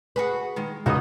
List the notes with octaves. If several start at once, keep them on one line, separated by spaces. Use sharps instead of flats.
F#4 G#4 B4
D#3 G#3
C#2 D#4 F#4 D#6